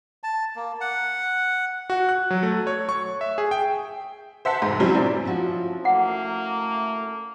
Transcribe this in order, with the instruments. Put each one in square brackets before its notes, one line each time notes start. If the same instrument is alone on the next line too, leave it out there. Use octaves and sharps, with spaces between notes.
[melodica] A5
A#3
F#5
[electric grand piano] F#4
F#6
F#3
A3
C#5
C#6
E5
G#4
G5
[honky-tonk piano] C5 E5 F#5 A5
F1 G#2
F#3 G3 C4 C#4 E4
A#2 C4 D4 E4
[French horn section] F3 [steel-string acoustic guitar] C#4 E4 F#4
[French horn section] A3 [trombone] A#3 [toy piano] F#5